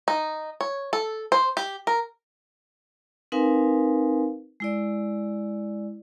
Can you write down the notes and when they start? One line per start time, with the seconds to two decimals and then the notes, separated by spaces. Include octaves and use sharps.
0.08 D#4
0.61 C#5
0.93 A4
1.32 C5
1.57 G4
1.87 A#4
3.32 C4 D#4 A#4 B4 F5 G#5
4.60 G#3 E4 D5